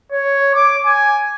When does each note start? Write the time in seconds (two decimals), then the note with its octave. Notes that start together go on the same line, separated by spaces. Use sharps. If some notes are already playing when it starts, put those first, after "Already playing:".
0.12 C#5
0.54 D6
0.86 G#5